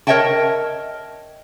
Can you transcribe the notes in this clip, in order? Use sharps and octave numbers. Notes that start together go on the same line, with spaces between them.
A#4 C#5 D#5 E5 G5 A5